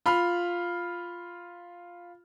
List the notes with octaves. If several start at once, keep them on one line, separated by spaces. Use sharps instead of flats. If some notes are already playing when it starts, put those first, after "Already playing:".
F4 B5 F6